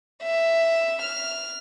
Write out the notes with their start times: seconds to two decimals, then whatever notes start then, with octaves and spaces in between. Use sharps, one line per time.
0.23 E5
1.02 F6